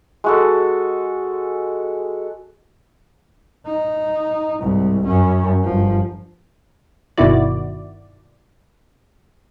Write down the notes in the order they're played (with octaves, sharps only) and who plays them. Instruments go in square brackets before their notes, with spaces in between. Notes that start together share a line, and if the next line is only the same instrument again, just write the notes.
[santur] G#3 F#4 A4
[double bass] D#4
C2 G#2
F#2 C#4
G1 F3
[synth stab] G1 B2 D#3 E4 F#4 D5